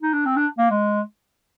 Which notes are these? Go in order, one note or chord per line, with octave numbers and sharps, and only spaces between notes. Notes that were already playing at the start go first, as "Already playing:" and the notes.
D#4
D4
C4
D4
A#3
G#3